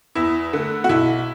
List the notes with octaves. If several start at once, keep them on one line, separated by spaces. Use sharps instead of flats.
E2 E4
D3 A3
F#4
B1 E4